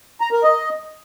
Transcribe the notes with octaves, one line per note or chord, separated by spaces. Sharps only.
A#5
A#4
D#5